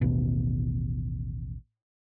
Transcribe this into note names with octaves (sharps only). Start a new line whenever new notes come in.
A1 D#2 B2